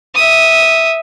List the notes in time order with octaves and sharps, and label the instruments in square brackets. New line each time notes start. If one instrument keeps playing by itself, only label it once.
[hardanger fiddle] E5 D#6